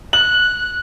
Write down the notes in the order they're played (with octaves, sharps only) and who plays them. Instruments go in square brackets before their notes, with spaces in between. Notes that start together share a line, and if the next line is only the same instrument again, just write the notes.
[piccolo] F#6 [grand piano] F#7